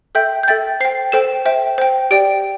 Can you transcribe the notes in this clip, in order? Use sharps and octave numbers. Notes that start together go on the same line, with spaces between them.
A4 E5 G5 G6
G6
A4 E5 G5 A6
C5 G5 C7
A4 C5 G5 E7
C5 E5 G5
C5 G5
G4 D5 G5 D7